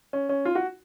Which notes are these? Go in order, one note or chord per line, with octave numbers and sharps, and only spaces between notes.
C#4
C#4
F4
F#4